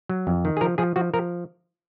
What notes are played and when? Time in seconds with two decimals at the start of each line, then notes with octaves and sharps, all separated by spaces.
0.09 F#3
0.27 F2
0.45 D#3
0.57 G#4
0.61 F3 A#4
0.78 F3 G#4
0.96 F3 F#4
1.14 F3 A#4